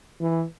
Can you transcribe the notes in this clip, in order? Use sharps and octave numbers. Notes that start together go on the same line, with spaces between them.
E3